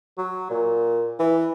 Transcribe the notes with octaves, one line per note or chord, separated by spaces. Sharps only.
F#3
A#2
E3